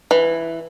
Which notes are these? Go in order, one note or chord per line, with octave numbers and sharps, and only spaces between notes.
E3